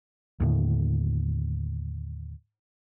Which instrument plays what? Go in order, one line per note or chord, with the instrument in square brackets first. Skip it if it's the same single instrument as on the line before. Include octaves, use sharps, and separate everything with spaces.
[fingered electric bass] D#2 A2 D3